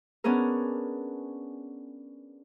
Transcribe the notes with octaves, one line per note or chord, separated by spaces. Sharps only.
B3 C#4 D4 G#4 A#4